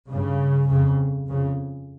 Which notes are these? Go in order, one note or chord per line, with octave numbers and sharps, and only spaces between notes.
G2 C#3
F2 C#3
F2 C#3